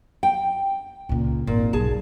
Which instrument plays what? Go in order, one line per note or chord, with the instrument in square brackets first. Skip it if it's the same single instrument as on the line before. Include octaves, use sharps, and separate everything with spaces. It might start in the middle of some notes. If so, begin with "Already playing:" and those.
[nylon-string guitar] G5
[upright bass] C#2 A#2
[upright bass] G#1 [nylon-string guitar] A#2
[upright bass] B1 [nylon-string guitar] G#4 A5